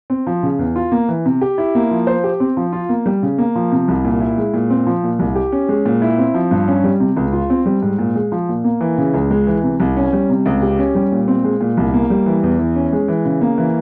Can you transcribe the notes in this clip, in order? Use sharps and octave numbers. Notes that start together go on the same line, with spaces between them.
C4
F3
C#3
E2
F4
A#3
E3
C3
G4
E4
A#3
F3
C5
G4
C4
F3
F4
A#3
G3
C#3
A#3
F3
C3
C2
A#2
E4
G#3
A#2
C4
F3
A#2
C2
G4
C#4
G#3
A#2
E4
C4
F3
G2
C#4
G3
C3
C#2
F4
C4
G3
G#2
A#2
G#3
F3
A#2
A#3
E3
C#3
C#2
G#3
E3
C3
C2
C#4
G3
C3
C#2
G4
C#4
G3
A#2
C4
G#3
A#2
C2
A#3
G3
E3
E2
E3
C#4
G#3
E3
C#3
A#3
E3